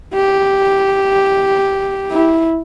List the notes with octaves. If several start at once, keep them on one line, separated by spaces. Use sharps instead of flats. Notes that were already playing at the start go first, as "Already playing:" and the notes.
G4
E4